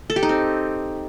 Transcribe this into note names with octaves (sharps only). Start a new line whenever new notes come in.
A4
G4
D#4
C4